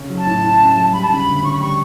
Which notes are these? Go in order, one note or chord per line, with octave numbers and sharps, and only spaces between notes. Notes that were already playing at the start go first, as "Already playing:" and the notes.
Already playing: C#3 C#4
F#3
A5
A2
E4
C#4
F#3
G3 B5
A5
C#3 B5
D2
C#4 C#6
B5
G3 C#6